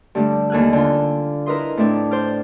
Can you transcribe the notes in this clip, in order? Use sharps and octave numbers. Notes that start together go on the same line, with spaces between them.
G2 D3 G3 A3
D#2 A4 G#5 F6 F#6
D3 F4
E4 A#4 B4 D#5 C6
A2 A3 C4 D4
C5 D5 F6